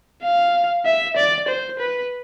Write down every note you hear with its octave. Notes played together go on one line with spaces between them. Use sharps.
F5
E5
D5
C5
B4